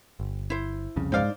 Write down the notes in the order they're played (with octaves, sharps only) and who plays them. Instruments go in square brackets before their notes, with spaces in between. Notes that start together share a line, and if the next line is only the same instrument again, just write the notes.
[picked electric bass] G1
[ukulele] E4 C5
[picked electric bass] C2 F2 C#3
[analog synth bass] G#2 [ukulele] D#4 D5 [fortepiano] C5 F5